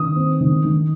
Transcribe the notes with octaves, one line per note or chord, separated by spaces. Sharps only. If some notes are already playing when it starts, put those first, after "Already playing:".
Already playing: D#3 D#6
C4
D#3
D#3